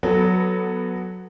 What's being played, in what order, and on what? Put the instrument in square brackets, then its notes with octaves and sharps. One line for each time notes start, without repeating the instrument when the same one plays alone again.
[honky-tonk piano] F#3 B3 A4